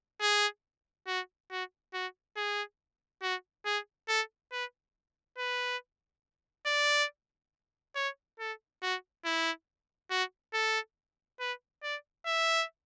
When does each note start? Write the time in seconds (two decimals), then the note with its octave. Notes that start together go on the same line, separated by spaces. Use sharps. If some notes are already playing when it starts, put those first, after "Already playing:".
0.21 G#4
1.07 F#4
1.51 F#4
1.94 F#4
2.37 G#4
3.22 F#4
3.66 G#4
4.09 A4
4.52 B4
5.38 B4
6.66 D5
7.96 C#5
8.40 A4
8.83 F#4
9.25 E4
10.11 F#4
10.54 A4
11.40 B4
11.83 D5
12.26 E5